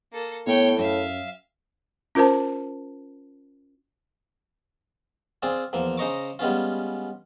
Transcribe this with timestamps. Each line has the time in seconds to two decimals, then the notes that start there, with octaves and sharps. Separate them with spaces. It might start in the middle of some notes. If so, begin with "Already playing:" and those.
0.12 A#3 A4
0.47 A2 B3 C#5 G5
0.78 F#2 E5 F5
2.15 C#4 F4 A#4 C5 A5
5.42 C4 F4 G#4 D5 G#5
5.73 E2 F3 A#3
5.98 C#3 C5 D#5 A#5 C#6 D6
6.39 G3 G#3 B3 C#4 F4